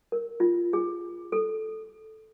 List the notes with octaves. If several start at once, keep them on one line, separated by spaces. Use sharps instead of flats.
A#4
F4
G#4
A4